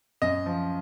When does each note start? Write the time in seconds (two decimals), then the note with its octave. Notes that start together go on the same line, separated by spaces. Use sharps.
0.22 F#2 D#5
0.46 F3